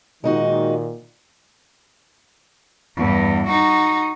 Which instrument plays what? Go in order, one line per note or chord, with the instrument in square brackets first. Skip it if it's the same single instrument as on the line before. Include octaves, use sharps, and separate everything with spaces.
[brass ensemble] A#2 D#3 [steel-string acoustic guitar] G#3 D#4 F#4
[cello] E2 G2
D#4 F#4